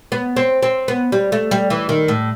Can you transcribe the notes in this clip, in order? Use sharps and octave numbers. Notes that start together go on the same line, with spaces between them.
B3
C4
C4
B3
G3
A3
G3
E3
D#3
A2